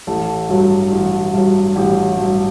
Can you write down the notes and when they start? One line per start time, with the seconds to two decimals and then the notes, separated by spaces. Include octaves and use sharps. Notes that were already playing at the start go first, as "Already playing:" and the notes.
0.07 A1 A4
0.49 G2 F#3
0.92 A1
1.34 G2 F#3
1.76 A1 G4
2.18 G2 F#3